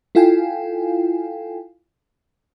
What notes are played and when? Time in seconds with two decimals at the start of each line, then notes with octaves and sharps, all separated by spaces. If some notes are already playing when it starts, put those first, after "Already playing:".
0.15 E4 F4 A4 F5 G5 G#5